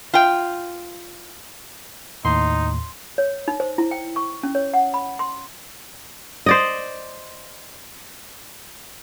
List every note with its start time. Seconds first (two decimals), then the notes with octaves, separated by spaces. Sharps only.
0.14 F4 G5
2.25 D#2 A2 D#4 C6
3.18 C#5
3.48 D#4
3.60 C5
3.78 E4
3.91 G5
4.16 C#6
4.43 C#4
4.55 C#5
4.74 F#5
4.94 B5
5.19 C6
6.46 C5 D5 D#5